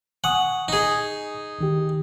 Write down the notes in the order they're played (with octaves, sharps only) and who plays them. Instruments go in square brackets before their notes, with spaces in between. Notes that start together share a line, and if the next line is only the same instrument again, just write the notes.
[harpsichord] F#5 [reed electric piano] G#5 C#6 D#6
[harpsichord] D#4 G#4
[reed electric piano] C#2 D#3 G4